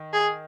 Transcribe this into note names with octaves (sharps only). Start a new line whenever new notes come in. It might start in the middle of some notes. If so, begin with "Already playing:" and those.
Already playing: D#3
G#4